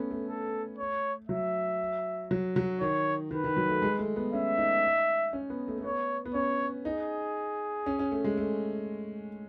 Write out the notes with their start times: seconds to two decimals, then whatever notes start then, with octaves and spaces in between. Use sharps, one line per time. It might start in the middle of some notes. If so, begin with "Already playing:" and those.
Already playing: A3 B3 C#4
0.11 A3
0.28 A4
0.78 C#5
1.29 F#3 E5
2.31 F#3
2.56 F#3
2.81 D#3 C#5
3.31 D#3 B4
3.44 D#3
3.57 F#3
3.69 A3
3.82 G#3
3.99 A3
4.16 B3
4.33 C#4 E5
4.58 D#4
5.33 C#4
5.50 B3
5.68 A3
5.78 A3
5.84 B3 C#5
6.25 B3
6.34 C#4 C#5
6.85 D#4 G#4
7.86 C#4
7.99 C#4
8.12 A3
8.24 G#3
8.37 A3